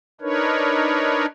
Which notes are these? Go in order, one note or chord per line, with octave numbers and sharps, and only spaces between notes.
D4 D#4 A#4 B4 C#5